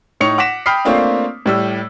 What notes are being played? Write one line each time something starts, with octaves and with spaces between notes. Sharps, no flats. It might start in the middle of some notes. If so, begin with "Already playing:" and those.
A2 D#4 C#5 C#6 C#7 F7
F#5 D6 A#6 B6 E7
G5 B5 D#6 F6 B6 C7
A3 A#3 C4 D4 F4 C#5
A2 G3 E6